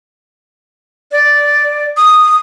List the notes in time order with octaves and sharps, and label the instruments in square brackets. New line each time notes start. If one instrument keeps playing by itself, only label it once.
[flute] D5
D#6